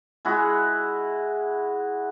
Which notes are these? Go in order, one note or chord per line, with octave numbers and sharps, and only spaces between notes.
G#3 E4 F#4